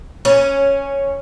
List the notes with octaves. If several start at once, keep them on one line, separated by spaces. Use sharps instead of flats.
C#4